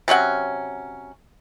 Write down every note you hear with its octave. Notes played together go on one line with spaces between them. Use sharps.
C3 F#3 C#4 F#5